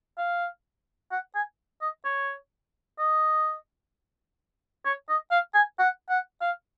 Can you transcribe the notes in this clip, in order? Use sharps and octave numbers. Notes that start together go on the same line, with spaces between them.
F5
F#5
G#5
D#5
C#5
D#5
C#5
D#5
F5
G#5
F#5
F#5
F5